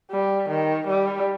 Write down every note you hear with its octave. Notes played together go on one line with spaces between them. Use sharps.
G3
D#3
G3